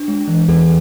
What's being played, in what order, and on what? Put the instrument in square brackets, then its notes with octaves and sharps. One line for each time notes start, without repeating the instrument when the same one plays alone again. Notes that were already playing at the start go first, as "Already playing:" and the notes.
Already playing: [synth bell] D4
G#3
E3
[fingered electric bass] E2 [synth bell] A4